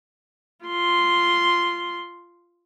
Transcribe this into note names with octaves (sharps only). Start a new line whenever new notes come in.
F4 C6